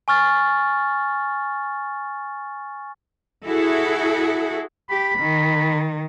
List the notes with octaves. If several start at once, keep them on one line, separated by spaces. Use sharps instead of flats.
G#5 C#6 F6 A6
E4 F#4 G#4 A4
G4 B5
D#3